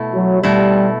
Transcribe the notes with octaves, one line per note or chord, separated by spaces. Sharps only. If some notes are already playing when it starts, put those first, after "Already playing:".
Already playing: B2 A3 E4
F#3
B2 G3 A3 E4